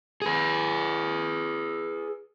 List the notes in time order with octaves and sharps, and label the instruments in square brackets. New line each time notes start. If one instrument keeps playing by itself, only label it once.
[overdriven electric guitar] G#4 B4